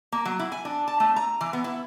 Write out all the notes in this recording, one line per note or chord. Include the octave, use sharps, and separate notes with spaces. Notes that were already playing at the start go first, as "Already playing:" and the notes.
A#3
F#3
E4
G#5
D4
A5
A3
A#5
E3
B3
E4